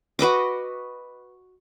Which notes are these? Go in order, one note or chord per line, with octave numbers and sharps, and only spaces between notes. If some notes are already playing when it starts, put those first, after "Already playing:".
F#4 B4 D#5 D6